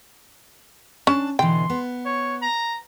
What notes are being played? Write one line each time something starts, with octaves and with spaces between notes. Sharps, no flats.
C#4 D4 A5
B2 D3 E3 G5 C6
B3
C#5
A#5